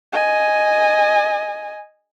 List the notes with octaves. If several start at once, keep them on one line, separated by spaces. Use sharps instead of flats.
D#5 G#5